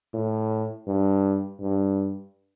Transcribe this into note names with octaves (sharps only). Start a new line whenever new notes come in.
A2
G2
G2